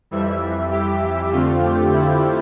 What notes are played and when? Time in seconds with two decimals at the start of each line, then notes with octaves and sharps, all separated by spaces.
0.11 F2 E3 G3 E5
0.71 G4
1.31 F2 D3 A3 C4 F4
1.63 G4
1.93 E4